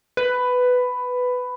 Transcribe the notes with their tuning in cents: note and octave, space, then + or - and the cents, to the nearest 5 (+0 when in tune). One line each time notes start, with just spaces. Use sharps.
B4 +10